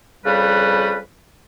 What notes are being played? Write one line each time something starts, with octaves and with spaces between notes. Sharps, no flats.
F2 C#3 G3 B4